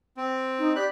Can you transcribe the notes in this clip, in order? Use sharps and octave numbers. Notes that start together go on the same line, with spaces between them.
C4
D#4
G4 D5 B5 F#6